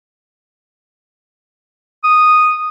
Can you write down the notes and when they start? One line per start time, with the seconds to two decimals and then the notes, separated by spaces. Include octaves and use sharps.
2.04 D#6